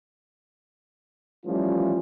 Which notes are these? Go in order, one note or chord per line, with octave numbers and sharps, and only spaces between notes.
E3 F3 G3 A3 C#4 F4